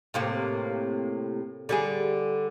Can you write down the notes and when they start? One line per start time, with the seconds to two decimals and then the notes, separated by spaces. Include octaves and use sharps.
0.14 A2 C3 A#3
1.69 D3 G3 G#4